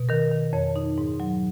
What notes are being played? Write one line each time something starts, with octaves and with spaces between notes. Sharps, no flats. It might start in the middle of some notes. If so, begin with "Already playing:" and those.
Already playing: B2
D#3 A#4
D#3
F2 C#5
D#4
G#2
F#3